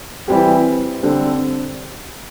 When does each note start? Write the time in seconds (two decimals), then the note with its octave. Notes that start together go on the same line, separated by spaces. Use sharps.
0.28 E3 G3 C4 G4
1.03 D3 G3 C4 A4